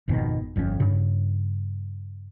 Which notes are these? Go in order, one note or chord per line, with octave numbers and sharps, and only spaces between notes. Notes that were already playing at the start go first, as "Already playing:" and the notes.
G#1 F2 B2 D#3
G1 F2 D3 C#4
G2 C#3